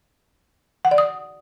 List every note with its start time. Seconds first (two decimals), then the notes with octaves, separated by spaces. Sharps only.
0.85 F#5
0.91 D5
0.98 D#6